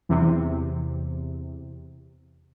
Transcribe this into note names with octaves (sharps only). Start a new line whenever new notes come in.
E2 C3